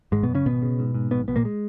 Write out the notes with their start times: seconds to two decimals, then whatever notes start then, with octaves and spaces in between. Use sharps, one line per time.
0.12 G#1 G#2 G#3
0.23 B2 B3
0.29 F#2
0.35 C#3 C#4
0.46 G#1 B2 B3
0.62 C#3
0.79 G#2
0.94 G#2
1.11 A#1 B2 B3
1.28 A#1 B2 B3
1.36 A#2 A#3
1.45 G#3